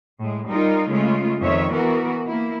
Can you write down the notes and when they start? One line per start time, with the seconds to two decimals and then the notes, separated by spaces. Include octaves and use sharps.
0.19 A2 G#3
0.48 G3 D#4 F4 A#4
0.90 C#3 G#3 A3 F4
1.42 F2 D#3 C#5 E5
1.73 E3 B3 F#4 A#4
2.28 A#3 E4